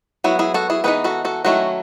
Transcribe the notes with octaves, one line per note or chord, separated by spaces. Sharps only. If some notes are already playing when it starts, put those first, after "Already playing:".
F#3 B3 E4 F#4
E4 G#4
F#4 A4
E4 G#4
E3 B3 D#4 G#4 B4
F#4 A4
F#4 A4
D#3 F#3 A3 C#4 E4 F#4